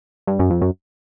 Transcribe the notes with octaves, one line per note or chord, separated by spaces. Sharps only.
G2
F#2
F2
F#2